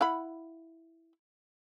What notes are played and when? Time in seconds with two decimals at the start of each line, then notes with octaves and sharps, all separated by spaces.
0.01 E4 F#5 B5